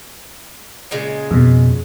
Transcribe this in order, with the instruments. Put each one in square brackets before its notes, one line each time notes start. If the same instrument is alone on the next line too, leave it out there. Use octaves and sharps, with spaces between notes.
[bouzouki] A#2 C#3 G#3
[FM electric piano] F2 B2